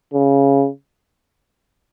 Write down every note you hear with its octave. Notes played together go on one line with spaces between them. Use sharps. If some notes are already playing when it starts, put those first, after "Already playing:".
C#3